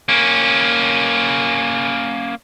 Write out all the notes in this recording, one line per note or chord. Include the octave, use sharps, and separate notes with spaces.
A#3 C#4